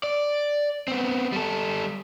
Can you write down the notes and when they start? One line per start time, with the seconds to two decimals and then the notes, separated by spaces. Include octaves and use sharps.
0.03 D5
0.88 B3 C4
1.32 G3 A4